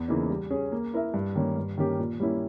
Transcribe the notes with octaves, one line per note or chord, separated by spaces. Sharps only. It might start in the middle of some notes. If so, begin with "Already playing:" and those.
Already playing: E2
C#3 E3 A#3 D#4
G3
C#4 G#4
A#3
E4 A#4 E5
G2
D#3 A#3 C#4
G2
D#3 A#3 C#4 G4
A#2
G3 A#3 C#4 E4